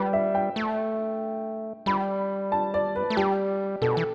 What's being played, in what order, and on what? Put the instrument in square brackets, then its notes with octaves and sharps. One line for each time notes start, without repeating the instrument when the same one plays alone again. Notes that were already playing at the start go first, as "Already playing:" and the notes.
Already playing: [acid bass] G3 [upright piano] B4
[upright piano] E5
G5
[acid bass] A3
[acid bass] G3 [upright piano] B5
[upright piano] A5
D5
B4
[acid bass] A3
[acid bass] G3 [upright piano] G4
[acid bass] B2 [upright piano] A4
[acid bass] E3